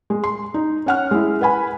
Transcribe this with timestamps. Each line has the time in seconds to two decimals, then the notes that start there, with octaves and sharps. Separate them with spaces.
0.10 G#3
0.24 C6
0.54 D#4
0.86 C#4 F#5 F6
1.11 G#3 E4
1.41 B4 F#5 G#5 B5